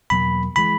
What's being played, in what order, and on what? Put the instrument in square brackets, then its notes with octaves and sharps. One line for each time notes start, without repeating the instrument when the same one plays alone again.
[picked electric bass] E2 B2 F#3 A#3 [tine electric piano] B5
[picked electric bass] E3 G#3 [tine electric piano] B5